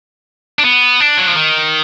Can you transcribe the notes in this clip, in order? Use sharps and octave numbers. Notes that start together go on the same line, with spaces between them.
D4
B3
D4
F#3
F3
D#3